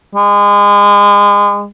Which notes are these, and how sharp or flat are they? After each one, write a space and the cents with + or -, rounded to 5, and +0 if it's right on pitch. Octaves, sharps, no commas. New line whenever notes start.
G#3 -30